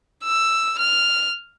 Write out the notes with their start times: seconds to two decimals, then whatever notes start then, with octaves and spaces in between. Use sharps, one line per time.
0.25 E6
0.78 F6